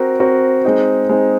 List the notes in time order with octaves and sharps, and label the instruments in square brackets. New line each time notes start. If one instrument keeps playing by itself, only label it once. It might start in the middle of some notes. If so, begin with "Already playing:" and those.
Already playing: [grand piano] C4 F#4 A#4
C4 F#4 A#4
G#3 C4 D#4
G#3 C4 D#4